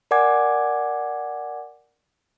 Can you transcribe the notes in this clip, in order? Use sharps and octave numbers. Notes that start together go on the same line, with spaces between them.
A#4 D5 F#5 G#5 D6 G#6